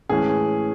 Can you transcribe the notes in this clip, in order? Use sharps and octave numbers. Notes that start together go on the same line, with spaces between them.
A2 E3 G#3 C#4 G#4